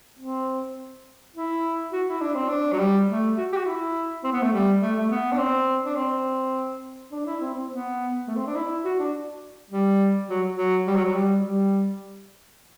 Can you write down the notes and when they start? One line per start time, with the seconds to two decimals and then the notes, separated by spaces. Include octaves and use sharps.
0.19 C4
1.35 E4
1.92 F#4
2.08 E4
2.21 D4
2.35 C4
2.48 D4
2.72 F#3
2.79 G3
3.08 A3
3.37 F#4
3.52 G4
3.56 F#4
3.66 E4
4.24 C4
4.32 B3
4.42 A3
4.53 G3
4.82 A3
4.95 A3
5.10 B3
5.32 D4
5.38 C4
5.85 D4
5.96 C4
7.12 D4
7.26 E4
7.40 C4
7.54 C4
7.70 B3
8.27 A3
8.36 C4
8.46 D4
8.55 E4
8.84 F#4
8.99 D4
9.70 G3
10.28 F#3
10.53 F#3
10.87 G3
10.95 F#3
11.05 F#3
11.14 G3
11.43 G3